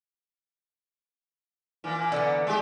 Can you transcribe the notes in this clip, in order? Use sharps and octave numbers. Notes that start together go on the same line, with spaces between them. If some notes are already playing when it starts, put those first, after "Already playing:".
A#2 E3
D3 A#3 B3
G#3 G4